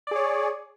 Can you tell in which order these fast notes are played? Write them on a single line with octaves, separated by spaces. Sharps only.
D5 G#4 C#5